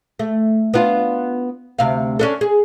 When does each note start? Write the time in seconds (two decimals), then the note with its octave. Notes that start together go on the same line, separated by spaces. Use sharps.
0.19 A3
0.74 B3 D4 F4
1.79 D2 C3 F5
2.19 C#4 D4 A4
2.41 G#4